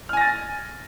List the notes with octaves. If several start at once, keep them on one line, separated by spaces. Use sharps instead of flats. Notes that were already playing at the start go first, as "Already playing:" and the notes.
G#5 F6 A6 A#6